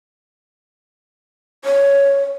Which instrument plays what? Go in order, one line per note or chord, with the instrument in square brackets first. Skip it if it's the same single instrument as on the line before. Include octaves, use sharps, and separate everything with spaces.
[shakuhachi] C#5